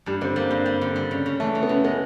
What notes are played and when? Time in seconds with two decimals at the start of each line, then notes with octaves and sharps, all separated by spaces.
0.06 G2 G3
0.21 D3 C4
0.36 G3 A#3
0.51 G2
0.66 G3
0.81 D3
0.96 G3
1.11 C#3
1.26 C#3
1.40 E3 A3
1.55 C#3
1.63 B3
1.69 C#3
1.84 G#3 B3